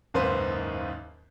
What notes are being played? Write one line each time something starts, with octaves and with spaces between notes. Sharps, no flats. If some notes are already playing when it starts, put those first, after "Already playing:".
F#1 D#2 G#2 B4 C5